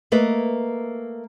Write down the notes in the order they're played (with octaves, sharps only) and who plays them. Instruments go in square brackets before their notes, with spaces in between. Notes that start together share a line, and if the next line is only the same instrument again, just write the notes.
[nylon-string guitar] A3 A#3 B4 D#5